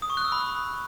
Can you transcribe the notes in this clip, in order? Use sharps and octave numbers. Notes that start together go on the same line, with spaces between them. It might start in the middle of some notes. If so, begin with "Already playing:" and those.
D#6
C#6
F#6
E6
B5